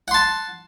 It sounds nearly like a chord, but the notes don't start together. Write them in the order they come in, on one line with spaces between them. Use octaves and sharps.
F#5 C6 A5